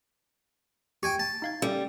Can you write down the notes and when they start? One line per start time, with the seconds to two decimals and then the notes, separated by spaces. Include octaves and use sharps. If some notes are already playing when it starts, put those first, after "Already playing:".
1.03 G4 G5 G#5 C#6
1.20 A5
1.42 D#4 F5 G#6
1.62 G3 C#4 G4 A4